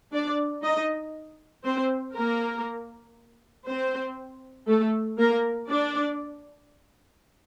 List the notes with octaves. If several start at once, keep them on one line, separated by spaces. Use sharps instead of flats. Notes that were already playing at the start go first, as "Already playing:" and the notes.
D4 D5
D#4 D#5
C4 C5
A#3 A#4
C4 C5
A3 A4
A#3 A#4
D4 D5